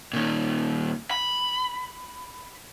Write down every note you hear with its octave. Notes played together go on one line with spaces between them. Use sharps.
A#2 D#3
B5